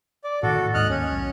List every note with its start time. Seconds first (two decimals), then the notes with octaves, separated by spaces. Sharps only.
0.24 D5
0.43 A2 C3 D#3 F#4 A4
0.56 A2
0.74 D#2 G#2 D#5 F6 F#6
0.89 D#2 C#4
1.11 B1